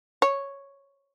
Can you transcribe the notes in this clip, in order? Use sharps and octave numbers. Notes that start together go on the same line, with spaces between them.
C#5